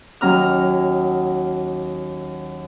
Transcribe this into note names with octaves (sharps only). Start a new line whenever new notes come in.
D#2 F#3 C#4 A#5 F6